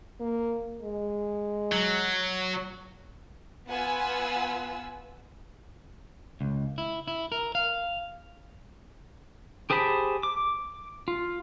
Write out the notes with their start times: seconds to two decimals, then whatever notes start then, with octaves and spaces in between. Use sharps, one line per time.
0.20 A#3
0.81 G#3
1.72 F#3
3.68 B3 F4 B4 F#5 G#5 E6
6.41 C#2
6.78 E4
7.08 E4
7.32 A#4
7.55 F5
9.70 G4 G#4 C5 A5 B5
10.23 D6
11.08 F4